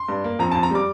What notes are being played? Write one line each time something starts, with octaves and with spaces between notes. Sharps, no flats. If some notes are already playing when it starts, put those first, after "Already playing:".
Already playing: C6
G2
A#3
F2 A#5
F2 A5
A#5
G3 D6